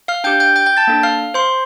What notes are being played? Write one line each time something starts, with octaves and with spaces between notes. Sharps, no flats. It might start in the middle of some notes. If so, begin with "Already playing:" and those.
F5 F6
D4 G4 G5 G6
G5 G6
G5 G6
G5 G6
A5 A6
A#3 D4 A4
F5 F6
C5 C6